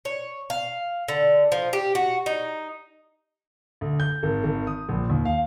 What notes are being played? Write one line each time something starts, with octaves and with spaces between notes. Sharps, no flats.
C#5
F5
D3
F3
G4
F#4
D#4
D2
G6
G#1
G#1
D#6
A#1
D#2
F5